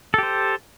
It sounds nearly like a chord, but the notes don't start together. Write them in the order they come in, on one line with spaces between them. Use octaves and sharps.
A4 G4 C5